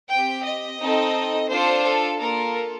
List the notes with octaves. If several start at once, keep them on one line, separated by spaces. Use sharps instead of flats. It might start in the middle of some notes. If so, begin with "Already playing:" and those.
C4 G4 G5
D#5
C4 D#4 A4
D4 F4 A4 C5
A4
A#3 F4 A4 A#4